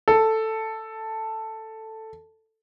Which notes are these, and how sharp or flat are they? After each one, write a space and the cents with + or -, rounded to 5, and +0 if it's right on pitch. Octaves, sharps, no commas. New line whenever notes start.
A4 +5